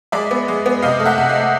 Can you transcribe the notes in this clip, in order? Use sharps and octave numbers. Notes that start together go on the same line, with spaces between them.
G#3 D5 E5
B3
G#3
B3
C3 D#5 F5
A3
E5 F#5
C3
D#5 F5
A3